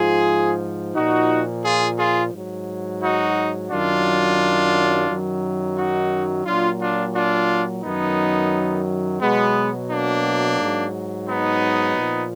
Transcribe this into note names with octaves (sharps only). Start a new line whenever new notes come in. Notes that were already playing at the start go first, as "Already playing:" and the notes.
Already playing: G#2 F3 F4 G#4
A#2 F3 D#4 F#4
F4 G#4
F4 G#4
G#2 F#3
D#4 F#4
F#2 D#3 F#3 D4 F4
F#2 D#3 F#3
D#4 F#4
A#2 F#3 D4 F4
D4 F4
D4 F4
F#2 D#3 F#3 B3 D#4
B2 F#3 G#3 B3
A#3 D4
G#2 F#3
B3 D#4
A#2 F3